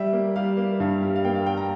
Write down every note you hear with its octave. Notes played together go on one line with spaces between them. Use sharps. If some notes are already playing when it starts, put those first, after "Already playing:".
Already playing: G3 E5
A#3
G3 F5
A#3
G2 F5
G3
F5
A#3 G5
F5
A#3 G5
A#5